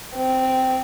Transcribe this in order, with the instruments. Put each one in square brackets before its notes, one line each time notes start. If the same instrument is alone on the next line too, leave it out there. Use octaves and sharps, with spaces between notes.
[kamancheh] C4